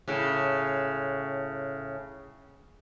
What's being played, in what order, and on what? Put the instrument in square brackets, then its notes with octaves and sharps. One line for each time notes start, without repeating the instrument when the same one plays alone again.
[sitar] A2 C#3